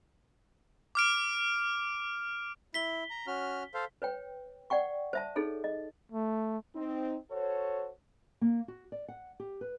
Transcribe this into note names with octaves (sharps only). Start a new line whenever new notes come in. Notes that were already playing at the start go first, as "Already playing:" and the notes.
D6 F6 D7
E4 B6 G7
A#5
C#4 F#4 F6
A4 C5 F5
B4 C#5 G5
D5 F#5 G5 C#6
C5 E5 A5
D#4 G#4 A4 C#5
D#5
A3
C4 D#4
F#4 A4 C5 C#5
A#3
F#4
D5
F#5
G4
B4